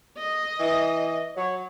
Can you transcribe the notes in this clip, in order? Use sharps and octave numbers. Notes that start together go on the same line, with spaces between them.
D#5
E3
F#3 C#5